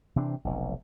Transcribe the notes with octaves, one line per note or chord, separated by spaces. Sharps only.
C3 E3 C4 D4
F1 B1